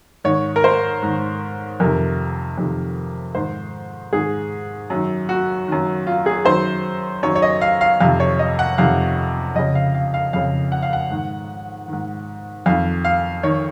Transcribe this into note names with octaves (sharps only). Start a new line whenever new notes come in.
G#2 D#3 C#5
A#4
C5
G#2 D#3
F2 C3 D#3 A#4
F2 C3 D#3
G#2 D#3 C5
G#2 D#3 G#4
F#2 D#3
F#4
F#2 D#3
F4
G#4
F#2 D#3 C5
F#2 D#3 C#5
C#5
D#5
F5
F5
F2 C3 D#3 F5
C#5
D#5
F#5
F2 C3 D#3 F5
F2 C#3 D#5
F5
F5
F5
F2 C#3 F5
F#5
F5
F#5
G#2 D#3
G#2 D#3
F2 D#3 F5
F5
D#3 C#5